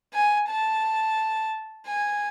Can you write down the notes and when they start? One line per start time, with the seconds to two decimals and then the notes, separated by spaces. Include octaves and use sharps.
0.14 G#5
0.48 A5
1.87 G#5